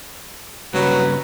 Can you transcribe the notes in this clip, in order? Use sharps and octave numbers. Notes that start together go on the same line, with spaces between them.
G2 C#3 F#3 B4